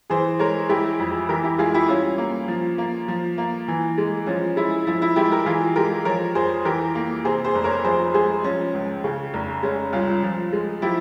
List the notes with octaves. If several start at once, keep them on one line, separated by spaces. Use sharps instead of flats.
E3 G#4 C5
G#3 A#4 C#5
G#3 E4 G4
F2
E3 G4 A#4
E4 G4
G#3 F4 G#4
E4 G4
G3 C#4 F4
A#3
F3
A#3
F3
A#3
E3
G#3
F3 C#4
G#3 E4
F3 E4
E4
G#3 E4 G4
G4 A#4
E3 F4 G#4
G#3 G4 A#4
F3 A#4 C#5
F2 G#4 C5
E3 G4 A#4
A#3
C3 G#4 C5
G#4 C5
F1
A#4 C#5
F3 G#4 C5
G#3 G#4 C5
F3 C#4
C#2
C#3
F1
G#3 C#4
C2 C#4 F4
F3
G#3
F3 E4 G4